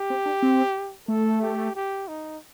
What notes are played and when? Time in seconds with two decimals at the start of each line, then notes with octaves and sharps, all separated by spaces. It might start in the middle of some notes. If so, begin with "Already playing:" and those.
Already playing: G4
0.10 C4
0.26 D4
0.42 C4
1.08 A3 A4
1.42 G4
1.75 G4
2.08 D#4